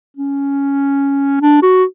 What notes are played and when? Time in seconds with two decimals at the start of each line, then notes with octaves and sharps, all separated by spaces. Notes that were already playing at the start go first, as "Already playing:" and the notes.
0.17 C#4
1.41 D4
1.62 F#4